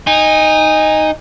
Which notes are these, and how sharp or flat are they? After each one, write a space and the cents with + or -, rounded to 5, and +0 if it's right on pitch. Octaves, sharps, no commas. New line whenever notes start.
D#4 +0 G#5 -25